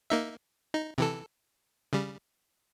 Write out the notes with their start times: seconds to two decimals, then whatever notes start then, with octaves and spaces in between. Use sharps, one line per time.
0.10 A#3 D#4 E5
0.74 D#4
0.98 C3 E3 A4
1.93 C#3 G3